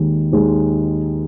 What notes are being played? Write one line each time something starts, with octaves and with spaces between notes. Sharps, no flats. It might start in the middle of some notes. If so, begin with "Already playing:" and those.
Already playing: D#2 D#3 G#3
D#2 D#3 G#3